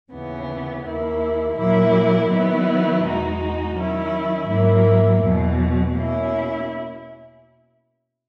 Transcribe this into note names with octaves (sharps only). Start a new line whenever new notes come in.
D#2 C#3 E3 B3
D#2 D#3 A#3 E4
A#2 F#3 A#3 E4
D#3 F#3 B3 E4
E2 B2 G#3 D#4 F#4
D#3 F#3 C#4 E4
G#2 F#3 A#3 E4
E2 B2 F#3
B2 A#3 C#4 E4